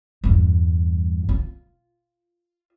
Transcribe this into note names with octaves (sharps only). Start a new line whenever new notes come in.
E2 G2
F4